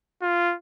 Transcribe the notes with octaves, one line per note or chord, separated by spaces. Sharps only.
F4